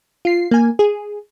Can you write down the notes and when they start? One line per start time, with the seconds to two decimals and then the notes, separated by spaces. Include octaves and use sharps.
0.25 F4 C7
0.51 A#3 G#5
0.79 G#4